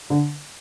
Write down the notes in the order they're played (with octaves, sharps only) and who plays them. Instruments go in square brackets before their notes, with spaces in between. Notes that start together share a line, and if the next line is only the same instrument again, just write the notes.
[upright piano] D3